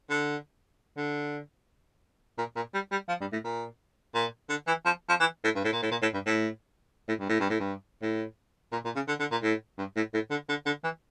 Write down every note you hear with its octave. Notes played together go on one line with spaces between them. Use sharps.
D3
D3
A#2
A#2
G3
G3
F3
G2
A2
A#2
A#2
D3
E3
F3
F3
E3
A2
G2
A2
A#2
A2
A#2
A2
G2
A2
A2
G2
A2
G2
A2
G2
A2
A#2
A#2
C#3
D3
D3
A#2
A2
G2
A2
A2
D3
D3
D3
E3